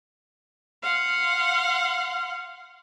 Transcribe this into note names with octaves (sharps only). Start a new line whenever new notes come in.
F5 F#5 C6